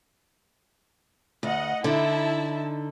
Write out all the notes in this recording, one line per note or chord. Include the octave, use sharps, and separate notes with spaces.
D2 D#5 F#5
D3 D#4 E4 E5 A5